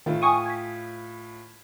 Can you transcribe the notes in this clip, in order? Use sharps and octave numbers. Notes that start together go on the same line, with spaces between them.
A2 D#3 E4 F4
G5 G#5 C#6 D#6
G#6 B6